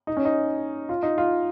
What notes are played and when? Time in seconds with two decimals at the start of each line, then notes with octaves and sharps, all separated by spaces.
0.07 D#4
0.17 C#4
0.25 D#4
0.89 F4
1.03 D#4
1.18 F4